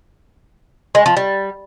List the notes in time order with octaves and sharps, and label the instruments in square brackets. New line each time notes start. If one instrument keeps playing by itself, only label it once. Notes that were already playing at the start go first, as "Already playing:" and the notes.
[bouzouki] G#3
F3
G3